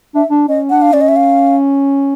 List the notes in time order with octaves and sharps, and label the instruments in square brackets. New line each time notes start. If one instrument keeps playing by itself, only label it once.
[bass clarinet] D4 [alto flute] E5
[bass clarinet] D4
[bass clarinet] C#4 [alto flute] D#5
[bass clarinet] D4 [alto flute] F#5
[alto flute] F5
[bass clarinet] C#4 [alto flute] D5
[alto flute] D#5
E5
F5